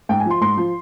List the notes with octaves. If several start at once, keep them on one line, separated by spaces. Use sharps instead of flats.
G#2 G5
G#5
F3 C6
G#2 C6
F3